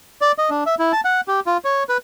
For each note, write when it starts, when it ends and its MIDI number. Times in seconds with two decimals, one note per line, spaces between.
0.21 0.32 74
0.38 0.50 75
0.50 0.64 62
0.66 0.75 76
0.79 0.92 64
0.92 1.01 81
1.05 1.21 78
1.28 1.40 67
1.47 1.57 65
1.65 1.84 73
1.89 1.97 71